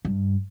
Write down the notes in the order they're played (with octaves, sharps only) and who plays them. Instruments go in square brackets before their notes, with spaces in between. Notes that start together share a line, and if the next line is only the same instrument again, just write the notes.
[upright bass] G2